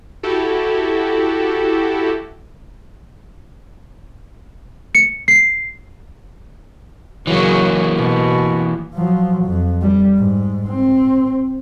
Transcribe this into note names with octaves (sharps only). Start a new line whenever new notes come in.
E4 F#4 G4 A4
C#7
C7
C#3 E3 F#3 A#3 G#4
B2
F3 F#3
F2
G3
G#2
C4